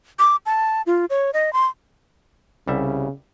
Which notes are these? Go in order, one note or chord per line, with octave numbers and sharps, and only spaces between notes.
D6
A5
F4
C#5
D#5
C6
C2 C#3 G3 E5